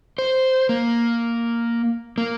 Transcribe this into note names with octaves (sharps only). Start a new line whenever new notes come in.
C5
A#3
A#3